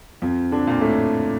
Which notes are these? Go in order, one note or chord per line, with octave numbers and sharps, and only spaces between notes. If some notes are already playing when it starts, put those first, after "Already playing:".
F2 F3
D3 D4
A#2 A#3
A2 A3